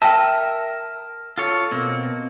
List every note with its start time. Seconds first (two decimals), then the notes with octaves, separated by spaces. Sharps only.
0.02 A#4 E5 G5 A5
1.38 F4 A4 C#5
1.71 B2 A#3 C4